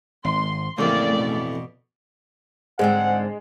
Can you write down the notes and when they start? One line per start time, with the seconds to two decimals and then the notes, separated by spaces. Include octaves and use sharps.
0.25 G#1 C6
0.79 A1 F2 C#3 A3 A#3 D5
1.17 B2
2.79 G#2 D3 G#3 C4 F#5